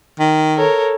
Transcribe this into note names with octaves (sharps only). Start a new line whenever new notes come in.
D#3
A4 A#4 C#5